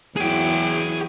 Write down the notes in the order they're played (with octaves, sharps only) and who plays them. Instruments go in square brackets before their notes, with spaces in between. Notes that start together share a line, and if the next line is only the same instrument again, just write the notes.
[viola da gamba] E2 F#3 E4 [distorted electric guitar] G#4 G5